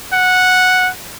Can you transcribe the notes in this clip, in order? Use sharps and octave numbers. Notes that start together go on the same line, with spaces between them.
F#5